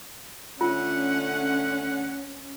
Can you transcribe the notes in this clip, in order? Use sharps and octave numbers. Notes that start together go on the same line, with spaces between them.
D3 A3 C#4 F4 F#5